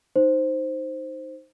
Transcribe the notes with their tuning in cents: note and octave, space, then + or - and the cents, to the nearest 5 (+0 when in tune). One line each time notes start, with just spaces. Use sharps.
D#4 +0 C5 +0